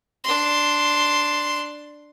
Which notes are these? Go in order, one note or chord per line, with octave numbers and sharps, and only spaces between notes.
D4 C6